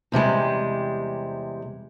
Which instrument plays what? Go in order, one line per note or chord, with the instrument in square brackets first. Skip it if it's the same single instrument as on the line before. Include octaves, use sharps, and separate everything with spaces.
[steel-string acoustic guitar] E2 C3 G3 G#3